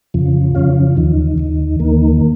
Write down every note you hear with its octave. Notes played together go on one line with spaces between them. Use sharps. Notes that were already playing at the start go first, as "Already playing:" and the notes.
F2 C#3 F3
F2 C#3 F3 C#4 F4
D#2 D#3
D#2 D#3
D#2 D#3 A#3